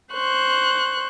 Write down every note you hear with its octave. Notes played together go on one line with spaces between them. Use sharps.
C5 C#6 F#6